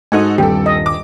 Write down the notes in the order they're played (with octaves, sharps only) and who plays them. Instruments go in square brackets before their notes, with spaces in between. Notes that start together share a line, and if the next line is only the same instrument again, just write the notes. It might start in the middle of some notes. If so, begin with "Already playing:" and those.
[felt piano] G#2 [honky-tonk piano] D#4 F#4 A4 [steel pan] G#5
[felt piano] D#1 G2 [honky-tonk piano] C4 A4 [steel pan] G4
[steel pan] D#5
[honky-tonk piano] D6